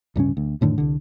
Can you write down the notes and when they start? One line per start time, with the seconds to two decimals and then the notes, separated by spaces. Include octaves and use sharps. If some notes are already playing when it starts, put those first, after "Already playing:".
0.16 D1 G2 C#3 C#4
0.37 D2
0.61 F2 A2 D3 D#3
0.78 C2 D3